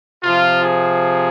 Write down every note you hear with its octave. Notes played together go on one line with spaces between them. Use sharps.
C3 F3 F4
G#4